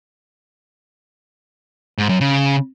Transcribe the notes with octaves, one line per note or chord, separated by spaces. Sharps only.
G#2
F#2
C#3